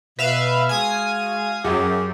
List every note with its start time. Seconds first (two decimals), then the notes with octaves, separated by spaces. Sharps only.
0.19 B2 B4 E5 F5
0.69 G#3 F#4 F5 G#5 D#6
1.64 F#2 G4 G#4